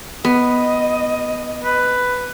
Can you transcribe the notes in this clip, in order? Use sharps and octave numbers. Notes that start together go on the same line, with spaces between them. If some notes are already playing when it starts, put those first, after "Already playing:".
B3 D#5
B4